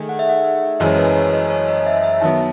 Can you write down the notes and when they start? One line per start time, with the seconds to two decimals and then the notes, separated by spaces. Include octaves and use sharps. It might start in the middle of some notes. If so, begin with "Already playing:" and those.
Already playing: D#3 A3 G#4
0.09 F#5
0.19 E5
0.29 F#5
0.44 E5
0.80 F#1 F#2 E3 G#3 C#4 D#5
0.98 B4
1.15 C#5
1.33 D#5
1.50 C#5
1.68 D#5
1.86 E5
2.03 E5
2.21 D#3 F#3 B3 A5